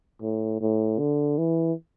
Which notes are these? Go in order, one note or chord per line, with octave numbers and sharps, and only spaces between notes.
A2
A2
D3
E3